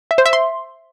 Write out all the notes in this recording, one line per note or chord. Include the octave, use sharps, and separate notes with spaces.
E5
C5
E5
C6